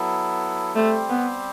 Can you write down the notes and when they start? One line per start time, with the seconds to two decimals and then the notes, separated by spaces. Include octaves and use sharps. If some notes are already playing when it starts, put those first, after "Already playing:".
Already playing: F#3 B3 E4 A4
0.74 G3 A3 C4 G4 C5
1.09 B3